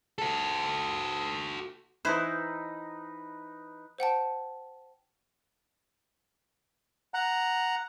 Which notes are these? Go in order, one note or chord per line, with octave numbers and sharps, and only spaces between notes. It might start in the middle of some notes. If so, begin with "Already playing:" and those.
F#4 A4
E3 D#4 E4 B4 C5
C5 F#5 G5 A5
F#5 A#5